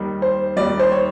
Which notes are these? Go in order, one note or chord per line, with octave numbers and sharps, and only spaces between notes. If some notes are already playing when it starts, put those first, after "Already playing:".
Already playing: D#2 D#3 G3
C5
D#2 D#3 G3 D5
C5
C#5